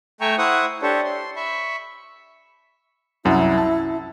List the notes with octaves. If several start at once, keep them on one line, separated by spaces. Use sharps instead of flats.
A3 E5 G5 G#5 A#5 C#6
E4 C5 F#5 C#6 D#6
D4 G4 A4 C5 C#5
C6
E5 B5 C#6
C2 F#2 E4 F#5
A5